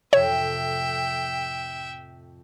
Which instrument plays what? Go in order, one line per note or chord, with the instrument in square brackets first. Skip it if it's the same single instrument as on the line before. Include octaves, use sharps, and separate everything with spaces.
[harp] F2 A2 C3 [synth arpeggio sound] C#5 [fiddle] E5 G5